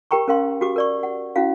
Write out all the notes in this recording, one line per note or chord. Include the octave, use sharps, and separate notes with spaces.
G4 A#4 G5 A#5 C#6
C#4 A#4 F5 C6
F#4 G4 D6
A#4 D5 C#6
F#5
C#4 E4 F#4 F5